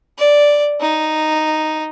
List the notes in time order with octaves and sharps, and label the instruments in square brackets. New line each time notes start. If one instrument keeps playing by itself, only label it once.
[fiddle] D5
D#4